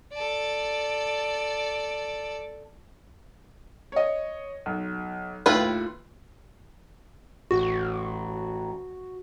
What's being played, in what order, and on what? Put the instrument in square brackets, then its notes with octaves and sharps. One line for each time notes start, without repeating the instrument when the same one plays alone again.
[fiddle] A4 D5
[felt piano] C#5 D#5
B1
[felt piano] D#2 A2 [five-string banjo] E4 F4 B4
[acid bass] A1 [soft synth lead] F#4